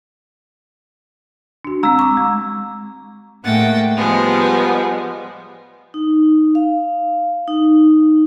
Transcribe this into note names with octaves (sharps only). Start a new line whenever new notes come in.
D4 F#4
G#3 C4 A#5 E6
C#6 D6
G#3
A2 G#3 A#3 F#5 G5 A6
F3 G3 G#3 B3
D#4
F5
D#4